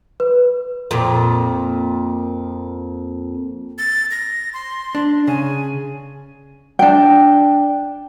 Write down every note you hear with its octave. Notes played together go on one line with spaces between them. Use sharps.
B4
F2 A#2
A6
A#6
C6
D4
C#3 G#5
D4 G5